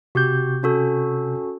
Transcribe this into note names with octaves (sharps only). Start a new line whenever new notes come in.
C3 F#4 G4 G6
C#4 F#4 A4